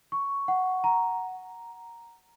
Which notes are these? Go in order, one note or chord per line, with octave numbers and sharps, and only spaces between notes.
C#6
F#5
A#5